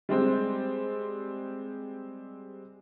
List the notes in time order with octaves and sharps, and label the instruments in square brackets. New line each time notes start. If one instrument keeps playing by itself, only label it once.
[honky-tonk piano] G3 G#3 C4